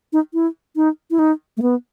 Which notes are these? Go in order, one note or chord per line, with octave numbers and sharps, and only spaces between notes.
D#4
E4
D#4
E4
D#4
A3
B3